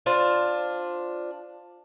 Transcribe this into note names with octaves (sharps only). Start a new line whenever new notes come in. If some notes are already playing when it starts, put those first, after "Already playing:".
D4 F4 C5